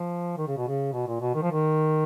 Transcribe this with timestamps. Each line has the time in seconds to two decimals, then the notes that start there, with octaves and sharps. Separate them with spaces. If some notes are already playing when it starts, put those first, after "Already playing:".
Already playing: F3
0.38 D#3
0.48 C#3
0.57 B2
0.67 C#3
0.93 B2
1.08 A#2
1.21 B2
1.35 D#3
1.42 F3
1.51 D#3